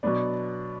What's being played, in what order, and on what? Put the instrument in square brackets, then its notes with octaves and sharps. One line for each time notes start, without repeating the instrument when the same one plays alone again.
[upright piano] B2 F#3 B3 D4